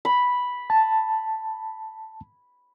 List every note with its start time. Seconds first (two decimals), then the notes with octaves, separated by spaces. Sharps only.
0.05 B5
0.70 A5